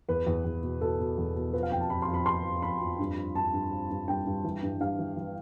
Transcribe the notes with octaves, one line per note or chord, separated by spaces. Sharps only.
E2 B4
E2
E2
B2
B2 A4
B2
E2
B2
F3 B4
F5
F2 G5
A5
F2 B5
C6
F2
B5
F2 C6
F3
F2 B5
F2
G2
F3
G2 A5
G2
F3
G2
G2 G5
G2
E3
G2
G2 F5
E3
E3